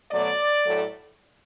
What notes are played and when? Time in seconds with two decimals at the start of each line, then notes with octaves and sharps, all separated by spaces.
0.11 B2 F#3 A3 D5
0.64 A2 F#3 A3